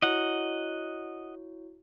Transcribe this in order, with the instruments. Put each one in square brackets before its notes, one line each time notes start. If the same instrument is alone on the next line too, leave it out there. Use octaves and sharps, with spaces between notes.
[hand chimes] E4 F#4 C#5 [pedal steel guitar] D#5 F#5